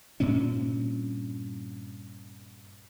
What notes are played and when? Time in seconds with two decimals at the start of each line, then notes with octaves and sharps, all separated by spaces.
0.20 G2 A#2 C4 C#4